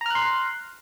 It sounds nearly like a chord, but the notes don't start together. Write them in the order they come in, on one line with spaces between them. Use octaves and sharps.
A#5 F6 F#6 C6